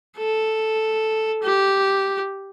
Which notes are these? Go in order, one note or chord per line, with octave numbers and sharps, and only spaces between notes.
A4
G4